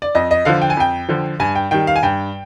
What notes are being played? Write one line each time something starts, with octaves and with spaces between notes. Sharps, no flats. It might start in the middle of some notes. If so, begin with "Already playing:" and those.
D5
F2 D#5
D#5
D3 F3 F5
G5
G#5
F2 G5
D3 F3
G2 G#5
G5
D#3 G3 G5
F5
G#5
G2 G5